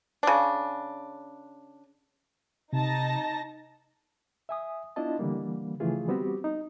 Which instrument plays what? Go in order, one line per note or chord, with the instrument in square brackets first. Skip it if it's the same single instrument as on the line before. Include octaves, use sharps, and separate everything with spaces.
[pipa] C#3 D4
[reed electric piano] C3 [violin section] D#4 A5 A#6
[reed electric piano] E5 G#5 D#6
B3 D4 E4 F4 D#5 A5
D3 E3 G3 A#3
C#3 E3 F3 A3 F4 G#4
G3 B3 C4 F#4 G4
D#4